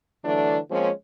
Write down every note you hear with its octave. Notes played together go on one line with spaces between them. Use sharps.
D3 E3 F#3 A3 D4
F3 G#3 A#3 C4 C#4